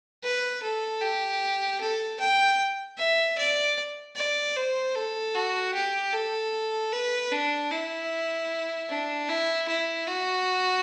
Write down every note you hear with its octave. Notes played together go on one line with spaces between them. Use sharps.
B4
A4
G4
A4
G5
E5
D5
D5
C5
A4
F#4
G4
A4
B4
D4
E4
D4
E4
E4
F#4